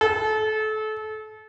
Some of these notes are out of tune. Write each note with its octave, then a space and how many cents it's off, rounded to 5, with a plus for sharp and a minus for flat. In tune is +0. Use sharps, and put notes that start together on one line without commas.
A4 -30